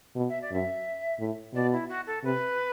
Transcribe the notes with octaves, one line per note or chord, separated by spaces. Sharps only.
B2
E5
D5
F#2 E5
A2
B2 D5
E4
F#4
A4
C3 B4